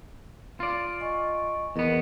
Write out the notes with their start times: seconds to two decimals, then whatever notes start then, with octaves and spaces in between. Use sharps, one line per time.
0.60 F4 D5
1.00 D#5 G#5 C#6
1.76 E2 B3 A#4 D#5